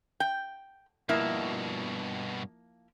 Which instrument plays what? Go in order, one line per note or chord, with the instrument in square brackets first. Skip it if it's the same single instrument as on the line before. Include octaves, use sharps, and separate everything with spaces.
[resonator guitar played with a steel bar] G5
[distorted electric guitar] G2 B2 [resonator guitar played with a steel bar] F3 A#3 E4